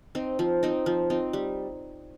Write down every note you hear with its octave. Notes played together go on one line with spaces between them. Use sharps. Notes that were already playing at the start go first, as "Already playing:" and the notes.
C4 D#4
F3
C4 D#4
F3
C4 D#4
G3